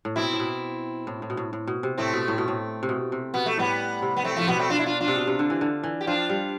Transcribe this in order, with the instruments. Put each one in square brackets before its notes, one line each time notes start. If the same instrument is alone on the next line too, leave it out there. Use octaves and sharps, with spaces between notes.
[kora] A2
[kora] B2 [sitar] C4 E4
[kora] A2
B2
A2
A2
B2
A2
A2
B2
C3
[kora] A2 [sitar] A3 C4
[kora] B2
A2
B2
A2
C3
B2
C3
[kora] B2 [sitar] B3
[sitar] A3
[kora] A2 [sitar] G3 B3
[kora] C3
[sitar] B3
A3 C4
[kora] A2 [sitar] F3 A3
[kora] B2 [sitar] G3 B3
[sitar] A3 C4
D4 F4
E4
D4 F4
D4 F4
[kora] C3
B2
C3
D3
E3
D3
E3
[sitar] G4
[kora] F3 [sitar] D4 F4
[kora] G3